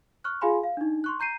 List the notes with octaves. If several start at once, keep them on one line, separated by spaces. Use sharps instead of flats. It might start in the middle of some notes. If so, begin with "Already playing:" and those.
C#6 F6 F#6
F4 G#4 F5 G#5 B5 C6
F5
D4 D#4
C6 C#6 F#6
A#5 G6 C7 D#7